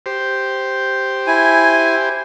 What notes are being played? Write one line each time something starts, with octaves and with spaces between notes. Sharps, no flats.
G4 C5
E4 G#5